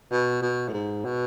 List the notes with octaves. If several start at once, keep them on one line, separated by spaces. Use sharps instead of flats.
B2
B2
A2
G#2
B2